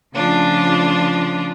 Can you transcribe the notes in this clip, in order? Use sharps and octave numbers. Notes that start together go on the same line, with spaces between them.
C#3 F3 A3 D4 F4